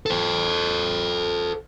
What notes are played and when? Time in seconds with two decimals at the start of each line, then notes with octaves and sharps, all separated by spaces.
0.06 A4 C5